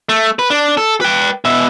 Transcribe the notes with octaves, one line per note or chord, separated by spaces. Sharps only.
A3
B4
D4
A4
B4 G5
B2 E5